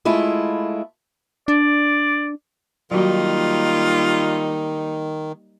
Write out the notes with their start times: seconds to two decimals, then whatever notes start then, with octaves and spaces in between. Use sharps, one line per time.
0.05 G#3 A3 E4 F4
1.48 D4 D5
2.91 D#3 F#3 G3 A#3 D#4 F4 F#4